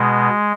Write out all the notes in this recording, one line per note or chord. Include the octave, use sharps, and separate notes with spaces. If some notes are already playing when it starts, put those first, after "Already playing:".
Already playing: B2 G#3